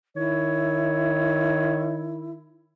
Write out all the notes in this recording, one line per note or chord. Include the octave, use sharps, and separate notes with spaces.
D#3 E4 C#5